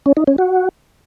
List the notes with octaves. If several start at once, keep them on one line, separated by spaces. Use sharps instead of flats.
C#4
D#4
C#4
F#4